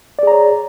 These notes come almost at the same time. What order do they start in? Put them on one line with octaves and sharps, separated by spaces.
D5 G#4 A#5 C#5